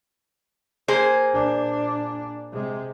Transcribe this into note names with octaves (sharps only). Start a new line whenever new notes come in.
A#3 G#4 C5
A#2 D4
C3 G#3